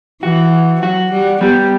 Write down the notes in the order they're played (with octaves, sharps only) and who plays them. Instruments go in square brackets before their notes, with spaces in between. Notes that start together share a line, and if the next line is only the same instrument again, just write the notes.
[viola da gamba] E3 [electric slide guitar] F#4
[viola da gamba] F#3 [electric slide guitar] F#4
[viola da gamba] G3
[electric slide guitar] G3 [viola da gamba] B3